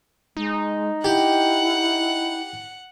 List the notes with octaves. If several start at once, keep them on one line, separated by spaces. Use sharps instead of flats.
G#3 D#4
E4 G4 F#5